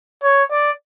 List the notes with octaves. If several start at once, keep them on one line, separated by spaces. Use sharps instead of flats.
C#5
D5